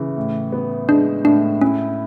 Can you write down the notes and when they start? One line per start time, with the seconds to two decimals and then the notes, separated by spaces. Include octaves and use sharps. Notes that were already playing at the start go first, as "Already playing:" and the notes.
Already playing: C#3 E3
0.17 A2
0.52 B3
0.89 G#3 D4
1.25 A2 D4
1.61 C#4 E4